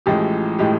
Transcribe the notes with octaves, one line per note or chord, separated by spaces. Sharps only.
A1 A2 F3 G#3 G4
A2 F3 G#3 G4